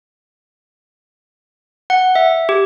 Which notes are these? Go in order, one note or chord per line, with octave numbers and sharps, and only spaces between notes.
F#5
E5
G4